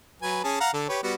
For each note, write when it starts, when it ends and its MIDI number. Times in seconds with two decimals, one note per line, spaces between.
0.22 0.39 54
0.22 0.39 71
0.22 0.39 80
0.44 0.56 61
0.44 0.56 68
0.44 0.56 81
0.60 0.70 77
0.60 0.70 78
0.60 0.70 82
0.73 0.88 50
0.73 0.88 69
0.89 1.02 67
0.89 1.02 71
0.89 1.02 73
1.03 1.14 55
1.03 1.14 59
1.03 1.14 66